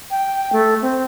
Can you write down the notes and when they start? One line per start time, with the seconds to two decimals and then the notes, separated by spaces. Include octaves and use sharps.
0.10 G5
0.53 A3
0.82 C4